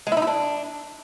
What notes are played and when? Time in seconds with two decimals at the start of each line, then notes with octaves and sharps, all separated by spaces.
0.07 G#3
0.12 E4
0.17 D#4
0.22 E4
0.27 D4